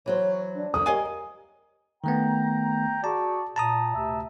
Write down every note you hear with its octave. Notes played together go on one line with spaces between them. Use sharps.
E3 F#3 C5 C#5
D4
F2 D3 D#6
G4 A#4 C#5 D#5 F5 G#5
D#3 A3 B3 G5 A#5
F#4 G#4 D5 A5
A#2 A5 A#5 D#6
D2 C3 E5